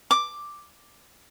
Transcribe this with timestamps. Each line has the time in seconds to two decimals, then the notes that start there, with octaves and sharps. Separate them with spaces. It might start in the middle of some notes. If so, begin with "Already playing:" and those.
0.11 D6